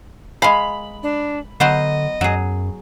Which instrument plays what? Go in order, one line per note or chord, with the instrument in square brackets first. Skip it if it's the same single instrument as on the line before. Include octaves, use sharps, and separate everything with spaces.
[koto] G#3 F5 [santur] B5
[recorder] D4
[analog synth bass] D3 [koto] F#3 B3 C5 [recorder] D#5
[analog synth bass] F#2 [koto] F#3 G#4